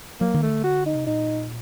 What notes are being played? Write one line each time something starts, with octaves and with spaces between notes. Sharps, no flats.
F#3 A#3
D#3
A3
D3
F#4
D#4
C3
A#2 D#4